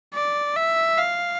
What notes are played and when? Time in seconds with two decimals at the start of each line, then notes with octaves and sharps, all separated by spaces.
0.15 D5
0.56 E5
0.98 F5